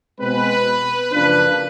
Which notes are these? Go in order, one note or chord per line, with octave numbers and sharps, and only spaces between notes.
B2 G#3 C4 B4
F#2 C#3 F3 A#3 D4 B4